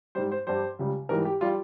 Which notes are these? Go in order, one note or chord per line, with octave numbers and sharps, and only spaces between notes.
G#2 G3 C5
C5
G2 G3 C5
C#2 C#3 G3
G#2 E3 G3 A#4
G4
G3 F4